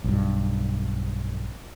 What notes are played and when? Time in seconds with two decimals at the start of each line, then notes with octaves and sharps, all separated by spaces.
0.04 B1 G2